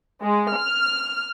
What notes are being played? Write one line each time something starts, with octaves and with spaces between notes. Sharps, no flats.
G#3
F6